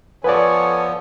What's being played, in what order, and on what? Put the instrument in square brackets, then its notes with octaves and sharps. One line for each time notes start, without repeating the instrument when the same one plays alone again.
[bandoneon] F3 B3 [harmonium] A4 C#5 G#5 [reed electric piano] B4 D5